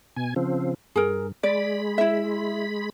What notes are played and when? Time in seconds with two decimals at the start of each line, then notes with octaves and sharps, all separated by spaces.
0.17 B2 G#5
0.36 C#3 F3 C4
0.96 G2 G#4 A#4
1.43 G#3 D5 B5
1.98 E4 E5